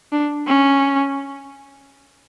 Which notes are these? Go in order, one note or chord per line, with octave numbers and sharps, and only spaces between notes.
D4
C#4